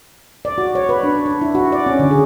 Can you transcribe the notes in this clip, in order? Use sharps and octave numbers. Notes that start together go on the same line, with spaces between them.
D5
F#4
C#5
B4
D4
D4
E4
F#4
D5
C#4
D3
G#4